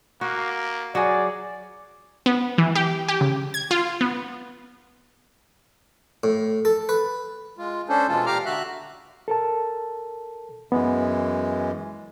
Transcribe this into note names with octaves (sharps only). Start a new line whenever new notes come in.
A#3 F#4
F#3 F#4 G#4 D5
B3
E3
G4
G4
C#3
G#6
F4
B3
A2
A4
B4
G#3 F4
C#4 D4 A4 C5
B2 E3 G#3 F4 A4
A#2 G4 F5 A#5 D6 F6
D3 F#4 E5 F#6
A4 A#4 A5
F#2 E3 G#3 B3